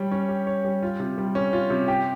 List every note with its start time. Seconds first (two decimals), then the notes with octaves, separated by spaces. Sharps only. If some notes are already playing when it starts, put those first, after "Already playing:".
Already playing: G3 C#5
0.11 C#4
0.29 G4
0.47 C#5
0.65 G3
0.83 F4
1.00 C3
1.18 G3
1.35 C#4
1.53 F4
1.70 C3
1.88 G4